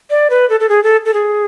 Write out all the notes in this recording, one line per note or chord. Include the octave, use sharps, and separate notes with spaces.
D5
B4
A4
A4
G#4
A4
A4
G#4